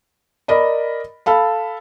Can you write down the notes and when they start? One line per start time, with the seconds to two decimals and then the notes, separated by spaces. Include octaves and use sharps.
0.48 A#4 D5 D#5 B5
1.26 A4 F5 B5